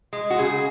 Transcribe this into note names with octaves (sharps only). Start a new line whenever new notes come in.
G#3
F#4
C#3 G#4